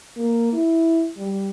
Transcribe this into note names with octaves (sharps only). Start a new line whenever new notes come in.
A#3
E4
G3